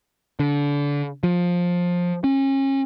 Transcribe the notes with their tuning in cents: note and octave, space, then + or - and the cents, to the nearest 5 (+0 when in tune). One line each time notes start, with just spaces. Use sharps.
D3 -30
F3 +15
C#4 -35